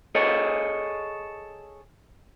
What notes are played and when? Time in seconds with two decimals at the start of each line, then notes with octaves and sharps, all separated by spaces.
0.15 G#4 A4 C#5 D#5